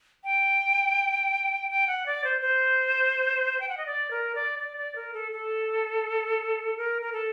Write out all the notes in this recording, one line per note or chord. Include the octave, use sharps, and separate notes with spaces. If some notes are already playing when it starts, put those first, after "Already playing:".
G5
G5
F#5
D5
C5
C5
G5
F#5
D#5
D5
A#4
D5
D5
D5
A#4
A4
A4
A#4
A#4
A4